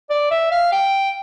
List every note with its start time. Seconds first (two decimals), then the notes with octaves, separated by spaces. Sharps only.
0.10 D5
0.31 E5
0.51 F5
0.72 G5